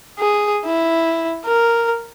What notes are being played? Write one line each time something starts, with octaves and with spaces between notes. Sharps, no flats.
G#4
E4
A#4